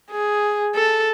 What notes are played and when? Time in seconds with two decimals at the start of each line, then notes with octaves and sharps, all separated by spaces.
0.11 G#4
0.75 A4